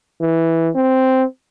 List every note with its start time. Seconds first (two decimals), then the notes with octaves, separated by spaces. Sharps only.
0.21 E3
0.75 C4